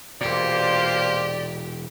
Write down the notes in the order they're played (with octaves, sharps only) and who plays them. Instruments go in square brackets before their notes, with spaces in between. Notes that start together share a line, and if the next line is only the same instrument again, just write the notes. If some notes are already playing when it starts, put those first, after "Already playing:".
[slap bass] E1 A#2 [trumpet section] A#3 F4 C5 [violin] G4 [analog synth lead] D5